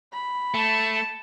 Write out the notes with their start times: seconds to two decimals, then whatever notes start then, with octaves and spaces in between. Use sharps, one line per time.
0.13 B5
0.54 A3 A5